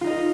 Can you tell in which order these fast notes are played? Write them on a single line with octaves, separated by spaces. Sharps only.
F4 D#4 D#5 A#4